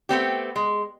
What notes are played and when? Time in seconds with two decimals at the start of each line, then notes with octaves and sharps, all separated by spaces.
0.09 A3 B3 C4 G4
0.56 G#3